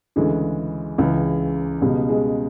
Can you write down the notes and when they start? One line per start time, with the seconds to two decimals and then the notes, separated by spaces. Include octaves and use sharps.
0.16 D2 C#3 E3 G#3
0.98 C#2 C#3 E3
1.81 C#2 B2 G3
2.09 G#3